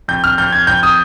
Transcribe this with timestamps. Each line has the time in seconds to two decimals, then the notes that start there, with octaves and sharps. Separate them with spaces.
0.08 F2 G6
0.24 F6
0.38 F2 G6
0.52 G#6
0.67 F2 G6
0.83 D#6